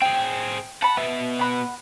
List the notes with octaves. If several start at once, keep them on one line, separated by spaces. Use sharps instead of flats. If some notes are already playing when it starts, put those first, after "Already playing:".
C4 G#4 G5
F#5 A5 B5
B2 B3 E5
F#5 B5